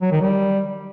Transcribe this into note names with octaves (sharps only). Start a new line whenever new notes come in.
F#3
D#3
G3